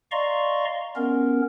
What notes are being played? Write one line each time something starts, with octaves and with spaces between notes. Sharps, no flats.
D5 D#5 F5 A#5 C6 C#6
B3 C#4 A#4